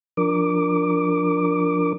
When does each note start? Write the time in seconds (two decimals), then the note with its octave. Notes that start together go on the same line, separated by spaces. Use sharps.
0.17 F3 D4 A#4 D6